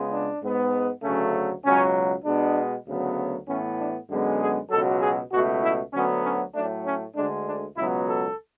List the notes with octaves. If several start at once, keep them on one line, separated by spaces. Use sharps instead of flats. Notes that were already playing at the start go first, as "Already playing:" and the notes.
Already playing: C#2 C#3 G#3 B3
D4
G#2 G#3 B3
D2 C#3 F#3 A3 C#4
C#2 B2 F#3 C#4
B2 G#3 B3 D4
D2 C#3 F#3 B3
A2 E3 B3 C#4
D4
F#2 D3 G#3 B3
G#4
C#2 B2 F#3 A4
G#4
C#2 B2 A3 F#4
E4
D2 D3 F#3 B3 C#4
C#4
A2 F#3 A3 D4
C#4
D2 D3 G#3 D4
D4
C#2 B2 F#3 B3 E4
A4